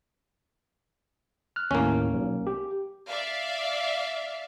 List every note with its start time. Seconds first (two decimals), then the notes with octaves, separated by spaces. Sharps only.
1.56 F6 F#6
1.71 D#2 A2 A#3 C#4
2.13 B1
2.47 G4
3.08 D5 E5 F5